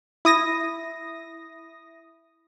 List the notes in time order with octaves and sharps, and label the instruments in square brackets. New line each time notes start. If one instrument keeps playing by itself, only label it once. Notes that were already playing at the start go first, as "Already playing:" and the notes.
[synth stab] E4 D#6 A#6